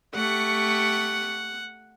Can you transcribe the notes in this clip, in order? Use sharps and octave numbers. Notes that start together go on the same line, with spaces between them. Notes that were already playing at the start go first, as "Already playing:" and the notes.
A3 G4 F#5 C#6